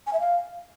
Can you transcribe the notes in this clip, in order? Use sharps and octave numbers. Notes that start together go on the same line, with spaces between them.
G#5
E5
F5